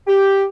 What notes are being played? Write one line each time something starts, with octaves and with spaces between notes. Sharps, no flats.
G4